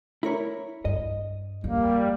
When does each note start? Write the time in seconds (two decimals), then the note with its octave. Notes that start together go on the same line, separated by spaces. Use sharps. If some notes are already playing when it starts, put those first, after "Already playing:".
0.23 E4 A#4 C#5
0.85 G2 D#5
1.64 F2 G3 A#3